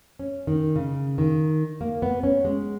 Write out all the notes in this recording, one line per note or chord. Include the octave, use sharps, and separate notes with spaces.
C#4
D#3
C#3
D#3
A#3
B3
C#4
G#3